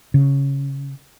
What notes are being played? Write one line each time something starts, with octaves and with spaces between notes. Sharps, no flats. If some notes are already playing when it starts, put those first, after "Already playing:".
C#3